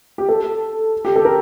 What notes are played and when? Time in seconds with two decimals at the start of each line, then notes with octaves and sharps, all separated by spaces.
0.18 G4
0.29 A4
1.05 G4
1.16 A4
1.25 A#4